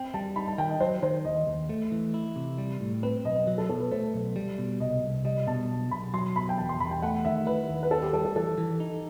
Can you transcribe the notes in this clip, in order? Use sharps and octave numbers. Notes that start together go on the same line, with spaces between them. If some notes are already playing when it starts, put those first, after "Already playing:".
Already playing: C4 G5
G3 A5
D#4 B5
A5
D#3 G5
D#5
F#3 C5
D#3 C5
D#2 D#5
D#2
A3
E3
E4
C3
G3
A2
C4 B4
B1 D#5
F#3
A4
B2 A4
B4
A3 C5
B1
G3
B2
C2 D#5
C2
G3 D#5
B2 A5
B1
B1 B5
F#3 C6
B2 B5
G5
E2 A5
C6
E2 B5
G5
A3 F#5
D#3 E5
E4 B4
D#2
B4
C4 A4
G4
G3 A4
A4
E3 A4
E3
D#4